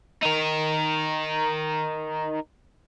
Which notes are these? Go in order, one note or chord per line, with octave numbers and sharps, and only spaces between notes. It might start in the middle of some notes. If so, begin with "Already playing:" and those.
D#4 A#4